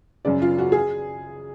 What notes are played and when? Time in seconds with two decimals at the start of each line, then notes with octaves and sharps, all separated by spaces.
0.25 F#2 C#3 D5
0.42 F4
0.58 F#4
0.72 G#4